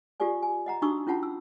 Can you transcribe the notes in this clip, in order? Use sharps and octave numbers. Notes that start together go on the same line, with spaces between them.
F4 G4 A4 D5 G#5
G#5
D#5 F#5 A#5
D4 D#4 F#4 C#6 D#6 E6
C#4 E4 F4 F#5 A5 B5
E6